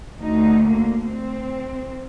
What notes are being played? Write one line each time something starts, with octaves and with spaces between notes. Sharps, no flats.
D2 D3 D#4
A#3
C4